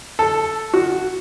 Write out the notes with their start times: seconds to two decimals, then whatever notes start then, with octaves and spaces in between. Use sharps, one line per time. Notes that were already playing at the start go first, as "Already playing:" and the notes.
0.19 A4
0.74 F#4